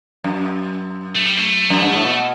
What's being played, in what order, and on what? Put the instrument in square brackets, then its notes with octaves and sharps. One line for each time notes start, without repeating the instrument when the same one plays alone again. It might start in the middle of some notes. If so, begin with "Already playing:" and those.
[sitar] F#2
[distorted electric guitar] A3
G3
A3
[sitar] F#2
G2
A2
B2